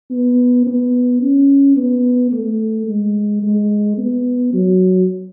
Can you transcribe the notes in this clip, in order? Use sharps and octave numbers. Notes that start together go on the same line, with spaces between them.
B3
B3
C#4
B3
A3
G#3
G#3
B3
F#3